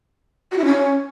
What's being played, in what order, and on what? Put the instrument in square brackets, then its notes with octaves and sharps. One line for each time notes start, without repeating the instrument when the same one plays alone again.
[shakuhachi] F#4
E4
C#4